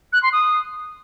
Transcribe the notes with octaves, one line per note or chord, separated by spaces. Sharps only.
F#6
C6
D#6